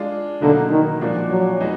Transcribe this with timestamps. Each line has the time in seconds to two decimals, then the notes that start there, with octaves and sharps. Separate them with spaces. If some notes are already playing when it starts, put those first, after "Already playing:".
Already playing: G#3 D4 F4
0.42 B2 D3 F#3 A#3 D#4 F#4
0.71 D#3
1.01 A#2 F3 G#3 D4 F#4
1.30 F#3
1.61 G#3 B3 D#4 F#4